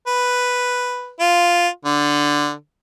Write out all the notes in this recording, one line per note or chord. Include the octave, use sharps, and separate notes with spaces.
B4
F4
D3